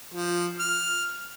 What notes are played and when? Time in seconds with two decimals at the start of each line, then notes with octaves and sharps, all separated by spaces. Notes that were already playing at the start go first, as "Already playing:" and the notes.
0.14 F3
0.60 F6